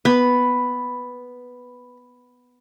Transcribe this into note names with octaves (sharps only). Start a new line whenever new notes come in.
B3 B4